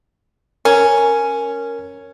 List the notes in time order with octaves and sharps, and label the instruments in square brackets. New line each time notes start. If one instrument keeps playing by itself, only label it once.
[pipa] C#4 [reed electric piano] A#4